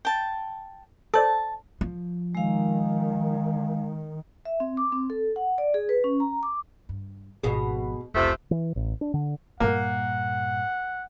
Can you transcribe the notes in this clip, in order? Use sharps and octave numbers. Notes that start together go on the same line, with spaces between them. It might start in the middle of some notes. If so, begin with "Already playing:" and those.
G5 A5
A4 C5 D5 A5
F3
D#3 G#3 F5
E5
C4
D6
C4
A4
F#5
D5
G#4
B4
C#4
A#5
D6
G2
G#1 B2 F3 G#4
F1 C#2 C3 F3 A3
E3
A1
D4
D3
G2 A#2 A#3 F#5